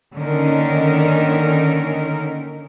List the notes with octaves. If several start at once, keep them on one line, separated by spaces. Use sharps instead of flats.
D3 D#3 A#3 C#4 D#4 A#4